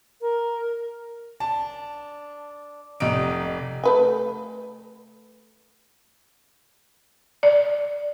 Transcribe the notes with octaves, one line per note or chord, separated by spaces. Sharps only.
A#4
D4 A5
F1 D#4 A#4 D5 D7
A3 B4 G#5
D5